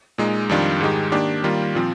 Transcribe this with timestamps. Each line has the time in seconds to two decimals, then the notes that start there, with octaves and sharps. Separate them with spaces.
0.18 A#2 G#3 D#4
0.49 F2 D#3 G3 D4 F4
0.81 G#2 D#3 G#3 D#4 G4
1.12 D#3 A#3 D4 G4
1.44 D#3 G3 A#3 F4
1.75 A#2 F3 C4